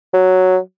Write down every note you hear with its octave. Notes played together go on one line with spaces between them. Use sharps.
F#3